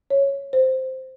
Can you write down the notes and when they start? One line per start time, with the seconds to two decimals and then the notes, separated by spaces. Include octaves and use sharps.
0.10 C#5
0.53 C5